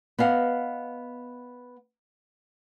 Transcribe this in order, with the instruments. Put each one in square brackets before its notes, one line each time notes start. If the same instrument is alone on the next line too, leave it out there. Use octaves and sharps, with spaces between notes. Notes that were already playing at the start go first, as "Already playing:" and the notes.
[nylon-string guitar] B3 D#5 F5 F#5